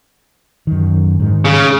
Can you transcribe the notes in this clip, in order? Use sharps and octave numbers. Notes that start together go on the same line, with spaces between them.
F#2 D#3
G#2 D#3
C#3